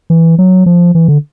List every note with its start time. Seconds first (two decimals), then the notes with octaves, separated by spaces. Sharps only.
0.10 E3
0.38 F#3
0.66 F3
0.95 E3
1.08 D3